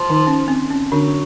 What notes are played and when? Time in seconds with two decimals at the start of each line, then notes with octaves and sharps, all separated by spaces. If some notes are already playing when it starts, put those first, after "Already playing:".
Already playing: F3
0.10 D#3 D#4
0.27 C#4
0.48 C4
0.71 C#4
0.92 D3 F#3 D4